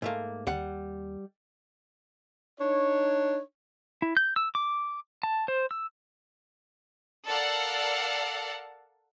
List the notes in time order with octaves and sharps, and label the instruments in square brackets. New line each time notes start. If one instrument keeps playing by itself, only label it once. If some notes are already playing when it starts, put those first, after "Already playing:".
[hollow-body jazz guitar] G#2 A3 A#3
[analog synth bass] D#2 [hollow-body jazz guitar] G3 F#5
[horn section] D4 D#4 C#5
[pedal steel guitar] E4
G6
E6
D6
A5
C5
E6
[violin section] A4 A#4 D5 F5 F#5 A5